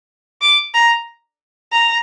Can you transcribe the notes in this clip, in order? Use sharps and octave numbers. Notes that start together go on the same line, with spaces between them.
D6
A#5
A#5